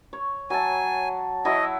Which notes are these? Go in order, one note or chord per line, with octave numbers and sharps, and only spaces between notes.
C#5
F#3 G#5 A5
F#3 E4 D#5